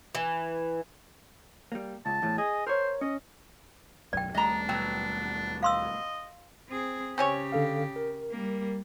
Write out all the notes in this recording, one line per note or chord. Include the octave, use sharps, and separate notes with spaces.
E3
G3 A#3
C#2 A5
E2 A2
G#4 D#5
A#4 C5 C#5
C#4 D#5
E1 B1 F#2 D5 G5
D#2 G3 A3 D4 D#5 A#5
B2 F#3 G5
D#5 F5 C6 E6
C4 G#4
C#3 C4 C#4 G4 C#5
D3 A4 F5
A#4
G3 A#3